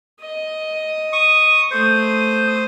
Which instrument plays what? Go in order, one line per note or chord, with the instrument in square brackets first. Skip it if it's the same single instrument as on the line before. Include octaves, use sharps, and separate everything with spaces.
[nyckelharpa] D#5
[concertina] C#6 D#6
[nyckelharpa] A3 D#6 [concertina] C5